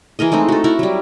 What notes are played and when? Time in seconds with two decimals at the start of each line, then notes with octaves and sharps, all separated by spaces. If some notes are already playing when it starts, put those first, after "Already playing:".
0.19 E3 G#4 A#4 D#5
0.32 G#3 A3 C4 D#4
0.48 F#4 A4
0.64 E4 F#4 A#4
0.79 F#3 G3